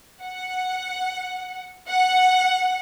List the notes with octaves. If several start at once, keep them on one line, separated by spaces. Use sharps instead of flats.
F#5
F#5